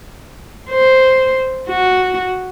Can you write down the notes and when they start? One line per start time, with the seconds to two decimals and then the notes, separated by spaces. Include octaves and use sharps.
0.70 C5
1.69 F#4